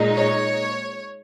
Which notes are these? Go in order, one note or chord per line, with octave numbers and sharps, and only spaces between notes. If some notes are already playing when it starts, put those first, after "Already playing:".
Already playing: A#2 G#3 D#4
C#5